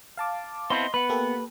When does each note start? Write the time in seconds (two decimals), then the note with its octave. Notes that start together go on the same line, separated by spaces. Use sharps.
0.17 F5 A5 D6
0.70 B3 C4 E4 D#5 C6
0.94 B3 B4 F#5
1.09 A#3 G4 A4